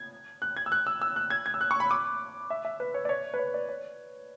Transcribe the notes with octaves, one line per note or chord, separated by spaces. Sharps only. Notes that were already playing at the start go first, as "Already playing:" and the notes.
Already playing: G#6
F#6
G#6
E6
F#6
E6
E6
F#6
G#6
G#6
E6
F#6
C#6
B5
D6
E5
E5
B4
C#5
D5
C#5
B4
C#5
D5
C#5